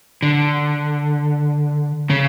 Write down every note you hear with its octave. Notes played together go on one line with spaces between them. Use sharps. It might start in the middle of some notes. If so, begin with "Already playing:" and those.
D3
C#3